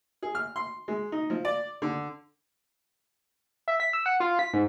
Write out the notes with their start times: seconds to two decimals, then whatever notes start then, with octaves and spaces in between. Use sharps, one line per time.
0.23 G#4
0.35 F6
0.56 C6
0.88 G#3
1.12 D#4
1.30 F3
1.45 D5
1.82 D3
3.68 E5
3.80 B6
3.93 E6
4.06 F#5
4.20 F4
4.39 B6
4.54 G#2